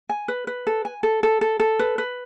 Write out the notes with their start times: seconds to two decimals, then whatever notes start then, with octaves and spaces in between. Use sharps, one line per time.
0.09 G#5
0.28 B4
0.47 B4
0.67 A4
0.85 G#5
1.03 A4
1.23 A4
1.41 A4
1.60 A4
1.79 B4
1.98 B4